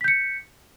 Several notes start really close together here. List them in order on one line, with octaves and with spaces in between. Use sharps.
B6 G6 C#7